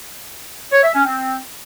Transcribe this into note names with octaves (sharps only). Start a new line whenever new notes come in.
C#5
E5
C#4
C4